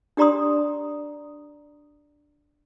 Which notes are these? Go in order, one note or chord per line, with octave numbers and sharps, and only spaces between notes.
D4 G4 D5 A#5 C6 D#6